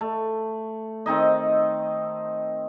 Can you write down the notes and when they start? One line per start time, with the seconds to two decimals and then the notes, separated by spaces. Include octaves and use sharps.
0.01 A3
1.06 D#3 C4 D#4 D#5